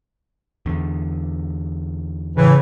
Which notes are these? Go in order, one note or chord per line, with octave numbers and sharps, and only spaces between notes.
E2 D3
A2 C#3 E3